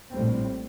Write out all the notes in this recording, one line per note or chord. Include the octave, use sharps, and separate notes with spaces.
A#1 A2 G3 C4